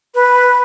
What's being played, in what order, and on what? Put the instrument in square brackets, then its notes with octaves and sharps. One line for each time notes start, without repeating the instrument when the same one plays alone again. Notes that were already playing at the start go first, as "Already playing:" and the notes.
[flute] B4